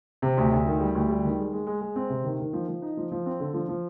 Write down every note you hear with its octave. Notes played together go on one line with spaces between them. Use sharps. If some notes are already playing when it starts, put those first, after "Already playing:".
C3
D2
D2
D#3
G3
D2
G3
D#3
G#3
G#3
G#3
G#3
C4
C3
D#3
D#3
F3
F3
D#4
F3
F3
C4
D3
F3
F3